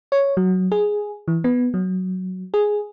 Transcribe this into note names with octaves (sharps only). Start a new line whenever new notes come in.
C#5
F#3
G#4
E3
B3
F#3
G#4